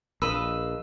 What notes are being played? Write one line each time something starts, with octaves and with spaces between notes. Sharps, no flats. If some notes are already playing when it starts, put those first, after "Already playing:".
A#1 B4 D#5 F5 E6